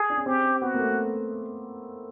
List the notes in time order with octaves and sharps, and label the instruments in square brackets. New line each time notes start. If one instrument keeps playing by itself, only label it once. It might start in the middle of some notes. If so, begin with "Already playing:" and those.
Already playing: [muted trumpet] G#4
[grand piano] D4
C#4
[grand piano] C4 [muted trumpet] G4
[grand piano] B3 [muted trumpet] F#4
[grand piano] A#3
A3